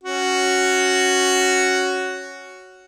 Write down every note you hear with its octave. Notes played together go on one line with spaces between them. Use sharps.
C#4 F#4